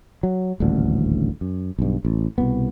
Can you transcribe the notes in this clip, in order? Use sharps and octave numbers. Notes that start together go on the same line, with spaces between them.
F#3
D#1 A1 D2 D3
F#2
B1 G2
A1
C2 B2 B3